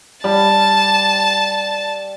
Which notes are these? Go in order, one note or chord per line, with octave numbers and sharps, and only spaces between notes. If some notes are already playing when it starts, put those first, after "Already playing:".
G3 A5